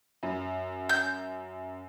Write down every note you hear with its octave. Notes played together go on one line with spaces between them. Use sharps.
F#2
G6